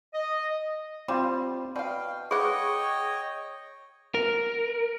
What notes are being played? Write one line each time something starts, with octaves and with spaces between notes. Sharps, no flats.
D#5
G3 C4 F4 B5
B2 D5 F5 G5
G#4 B4 C#5 D#5 F#5 G5 C#6
A#4